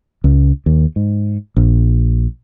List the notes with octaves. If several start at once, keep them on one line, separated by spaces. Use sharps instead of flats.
C#2
D#2
G#2
A#1